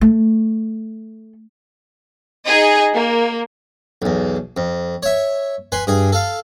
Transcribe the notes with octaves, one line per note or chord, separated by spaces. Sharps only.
A3
D#4 G#4 D#5
A#3
B1 E2
F2
C#5 E5
B4 G#5 C6
G2 G#4
A4 F5